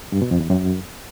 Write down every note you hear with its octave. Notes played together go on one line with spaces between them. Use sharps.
G2
B2
F2
E2
F#2